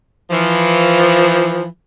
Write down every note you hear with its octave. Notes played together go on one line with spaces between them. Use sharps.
E3 F3